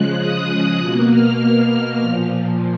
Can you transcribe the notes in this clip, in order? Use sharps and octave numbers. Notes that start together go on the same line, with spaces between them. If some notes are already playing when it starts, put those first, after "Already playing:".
Already playing: C#3 F3 G#3 F#6
D#6
B2 A#3 F#6
F6
A#2 F3 F6